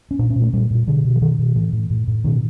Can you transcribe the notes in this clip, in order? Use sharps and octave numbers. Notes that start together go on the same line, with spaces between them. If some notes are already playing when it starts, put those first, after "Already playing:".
C#4
A#2 D4
C#4
A#2
A3
A#2 G3
A#2
B2 D3
B2
E3
B2 D#3
B2
A2 E3
A2
A2
A2
B2 D#3